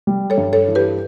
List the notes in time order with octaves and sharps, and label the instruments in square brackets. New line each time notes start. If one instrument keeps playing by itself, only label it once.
[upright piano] G3
[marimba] A4 C#5
[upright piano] G2
[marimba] A4 C#5
[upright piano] E3
[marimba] G4 B4